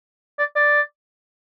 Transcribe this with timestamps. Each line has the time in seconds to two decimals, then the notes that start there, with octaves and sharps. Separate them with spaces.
0.39 D5
0.56 D5